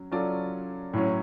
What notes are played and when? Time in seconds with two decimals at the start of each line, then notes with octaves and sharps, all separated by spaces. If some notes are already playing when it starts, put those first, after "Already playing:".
Already playing: F#3 C#4
0.11 F#3 C#4 F4 A4 D5
0.93 A2 F#3 C#4